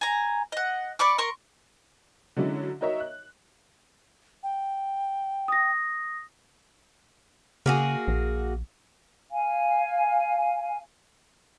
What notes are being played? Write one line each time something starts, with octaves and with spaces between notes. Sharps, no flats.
G#5 A#5
D#5 F#5
D5 B5 C#6 D6
A#4 C6 C#6
D3 F#3 G#3 C#4 E4
D#4 F#4 A#4 C#5 D#5 E5
F#6
G5
D#6 A#6
C#3 A#3 F#4 G#4
A#1
F5 G#5